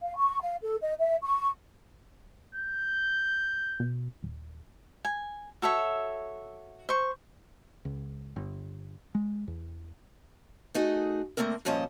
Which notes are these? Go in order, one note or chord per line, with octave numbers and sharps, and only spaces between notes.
F5
C#6
F5
A4
D#5
E5
C#6
G6
B2
D#1
G#5
F#4 A4 C#5 E5
C5 C#6
C#2
G1
G#3
E2
A3 D#4 F#4 G#4
D3 A3 A#3 C4 A#4
G2 A#2 F3 C#4 D#5 A5